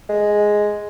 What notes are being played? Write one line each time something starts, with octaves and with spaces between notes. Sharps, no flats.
G#3